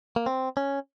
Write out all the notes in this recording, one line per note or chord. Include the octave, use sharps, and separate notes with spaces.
A#3
C4
C#4